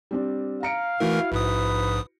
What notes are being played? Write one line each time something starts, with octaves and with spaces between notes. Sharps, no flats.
G3 C4 D4
F5 A#5 C#7 D7
E3 A3 E4 F#4 A#4
A#1 G#2 B4 D#6